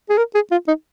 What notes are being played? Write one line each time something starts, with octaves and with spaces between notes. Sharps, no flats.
G#4
A#4
G#4
F4
D#4